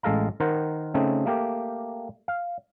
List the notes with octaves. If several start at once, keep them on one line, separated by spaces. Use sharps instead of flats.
A1 G#3 A4 F5 A#5
D#3 A#4 C5 F#5
C#3 A3 C4 D#4
A3 A#3 G4
F5